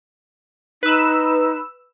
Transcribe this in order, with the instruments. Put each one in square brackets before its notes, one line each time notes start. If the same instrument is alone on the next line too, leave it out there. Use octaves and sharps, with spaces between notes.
[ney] D#4 [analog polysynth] B4 E6